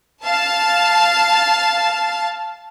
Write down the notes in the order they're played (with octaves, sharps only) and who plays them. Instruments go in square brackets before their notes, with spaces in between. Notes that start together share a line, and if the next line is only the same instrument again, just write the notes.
[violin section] F5 A5